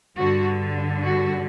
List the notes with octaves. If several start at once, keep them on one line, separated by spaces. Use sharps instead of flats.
G2 D3 F#4
F#4